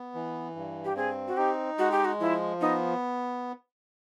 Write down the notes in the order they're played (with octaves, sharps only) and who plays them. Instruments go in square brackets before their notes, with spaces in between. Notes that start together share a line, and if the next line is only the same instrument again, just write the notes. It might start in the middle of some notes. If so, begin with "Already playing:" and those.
Already playing: [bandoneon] B3
E3
G2
[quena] G4
[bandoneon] C4 [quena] G#4
[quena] F#4
[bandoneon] D#4 [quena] G4
[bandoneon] G#3 [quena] F#4
[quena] G4
F#4
[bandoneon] F3 [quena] E4
[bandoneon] B3 [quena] D#4